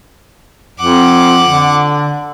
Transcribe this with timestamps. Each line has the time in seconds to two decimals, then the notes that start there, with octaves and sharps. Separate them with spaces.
0.79 F2 F#5 D6
1.45 D3